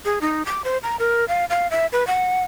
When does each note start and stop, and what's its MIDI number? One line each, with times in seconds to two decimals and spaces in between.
0.05 0.19 68
0.21 0.42 63
0.45 0.62 86
0.64 0.78 72
0.83 0.96 82
0.99 1.27 70
1.28 1.45 77
1.50 1.70 77
1.71 1.86 76
1.92 2.06 71
2.07 2.44 78